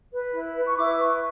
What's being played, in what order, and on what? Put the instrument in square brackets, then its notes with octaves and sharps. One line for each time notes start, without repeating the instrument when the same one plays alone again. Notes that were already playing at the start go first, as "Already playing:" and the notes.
[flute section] B4
E4
B4
C#6
E4 D6
B4 C#6